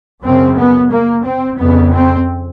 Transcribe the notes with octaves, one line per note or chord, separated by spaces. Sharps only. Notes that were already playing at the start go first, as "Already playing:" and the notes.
F#2 C#3 C4
B3
A#3
C4
F2 C#3 B3
C4